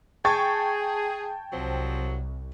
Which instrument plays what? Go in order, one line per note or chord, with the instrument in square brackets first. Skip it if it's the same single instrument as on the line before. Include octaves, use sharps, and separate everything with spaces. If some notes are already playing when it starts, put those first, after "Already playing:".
[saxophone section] G#4 [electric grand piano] G5 A5 G#6 [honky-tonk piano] C#6 A6
[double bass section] C2 [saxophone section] F3 F#3 C4